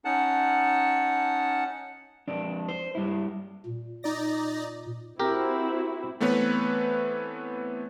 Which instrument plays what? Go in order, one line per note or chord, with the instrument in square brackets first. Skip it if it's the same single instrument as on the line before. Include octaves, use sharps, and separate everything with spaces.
[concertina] C#4 D#4 F#5 A5
[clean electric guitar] F2 D4
C5
G2 E4
[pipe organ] A#2
[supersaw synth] D#4 D5 A#6
[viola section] C4 E4 F#4 [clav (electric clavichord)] G4 A#4
[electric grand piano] E3 A3 B3 C4 B4 C#5